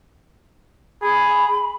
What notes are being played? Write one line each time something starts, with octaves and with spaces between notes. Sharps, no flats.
G#4 B5